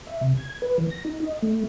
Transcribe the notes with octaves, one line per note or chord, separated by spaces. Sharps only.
E5
C3
G#6
B4
E3
A#6
D#4
D#5
A3